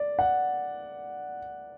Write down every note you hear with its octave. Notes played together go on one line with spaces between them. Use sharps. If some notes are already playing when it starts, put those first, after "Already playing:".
Already playing: D5
F#5